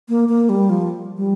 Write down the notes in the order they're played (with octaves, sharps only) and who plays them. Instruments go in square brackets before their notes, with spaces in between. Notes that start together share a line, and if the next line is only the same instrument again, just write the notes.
[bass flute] A#3
A#3
G3
F3
G3